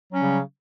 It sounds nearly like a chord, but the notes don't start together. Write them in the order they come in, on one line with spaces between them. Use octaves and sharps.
F#3 C#4 G3 C#3